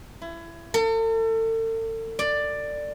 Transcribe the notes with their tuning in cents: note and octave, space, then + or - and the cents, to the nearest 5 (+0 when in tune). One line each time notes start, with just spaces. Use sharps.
E4 +25
A4 +40
D5 +10